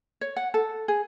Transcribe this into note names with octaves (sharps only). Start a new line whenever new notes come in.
C#5
F#5
A4
G#4